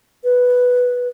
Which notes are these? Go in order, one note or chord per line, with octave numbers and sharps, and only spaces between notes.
B4